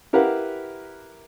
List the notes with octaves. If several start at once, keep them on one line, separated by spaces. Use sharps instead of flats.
E4 G4 A#4 B4 F5 F#5